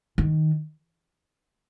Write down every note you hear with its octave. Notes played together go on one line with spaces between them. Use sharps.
D#3